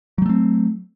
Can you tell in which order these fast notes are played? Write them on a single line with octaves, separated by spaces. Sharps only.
F#3 G3 A3 C4